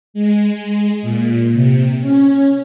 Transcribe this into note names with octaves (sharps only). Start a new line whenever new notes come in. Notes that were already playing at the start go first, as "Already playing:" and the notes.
G#3
A#2
C3
C#4